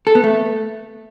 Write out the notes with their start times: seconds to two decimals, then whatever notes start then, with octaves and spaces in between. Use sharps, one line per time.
0.07 A4
0.15 B3
0.24 A3